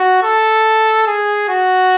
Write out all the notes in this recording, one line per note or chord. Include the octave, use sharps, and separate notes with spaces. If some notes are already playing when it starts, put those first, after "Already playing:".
Already playing: F#4
A4
G#4
F#4